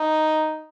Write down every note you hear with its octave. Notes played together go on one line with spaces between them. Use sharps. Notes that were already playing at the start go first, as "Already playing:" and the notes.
Already playing: D#4